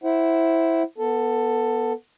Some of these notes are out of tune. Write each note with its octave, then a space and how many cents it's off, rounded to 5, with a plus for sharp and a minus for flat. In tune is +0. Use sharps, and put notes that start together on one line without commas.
E4 +0 C5 +5 F#5 +30
B3 -15 A4 +10